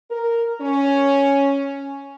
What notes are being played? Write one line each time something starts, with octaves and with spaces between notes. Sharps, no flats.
A#4
C#4